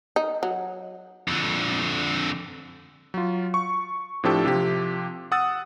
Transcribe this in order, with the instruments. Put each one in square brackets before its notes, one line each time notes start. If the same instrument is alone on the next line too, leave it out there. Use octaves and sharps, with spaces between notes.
[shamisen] D#4
F#3
[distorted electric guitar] F2 D3
[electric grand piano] F#3 F4
C#6
A2 F3 C4 D4 G4 A4
C3 F3 G4
F#5 D#6 E6 A6